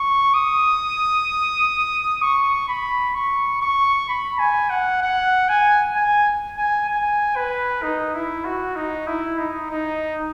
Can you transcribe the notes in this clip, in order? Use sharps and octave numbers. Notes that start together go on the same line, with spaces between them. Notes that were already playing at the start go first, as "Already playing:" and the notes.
Already playing: C#6
D#6
C#6
B5
C#6
C#6
B5
G#5
F#5
F#5
G#5
G#5
G#5
G#5
B4
D#4
E4
F#4
D#4
E4
D#4
D#4